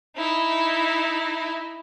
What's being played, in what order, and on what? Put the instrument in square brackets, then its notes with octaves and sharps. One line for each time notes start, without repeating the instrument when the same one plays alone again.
[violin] D#4 E4